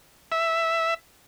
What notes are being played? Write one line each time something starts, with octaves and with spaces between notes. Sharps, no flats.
E5